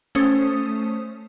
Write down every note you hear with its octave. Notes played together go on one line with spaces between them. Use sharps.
A3 C#4 C5 D#6